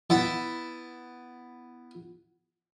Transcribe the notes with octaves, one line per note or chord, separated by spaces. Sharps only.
B3 E4 E5 A5